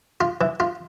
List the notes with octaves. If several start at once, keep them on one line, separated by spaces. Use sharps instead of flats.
F4
E3
F4